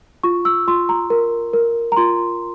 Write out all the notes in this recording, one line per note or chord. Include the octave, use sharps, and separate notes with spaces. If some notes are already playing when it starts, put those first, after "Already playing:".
F4 C#6
E6
F4 C6
A#5
A#4
A#4
A#5
F4 C6